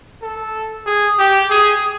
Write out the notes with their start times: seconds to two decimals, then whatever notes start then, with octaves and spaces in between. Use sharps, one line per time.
0.22 A4
0.86 G#4
1.19 G4
1.50 G#4